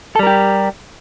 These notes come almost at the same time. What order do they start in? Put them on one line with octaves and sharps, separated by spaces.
A4 G3 A#4 G4